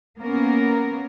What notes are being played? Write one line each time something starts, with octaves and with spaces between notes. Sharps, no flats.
A#3 B3 C#4 A#4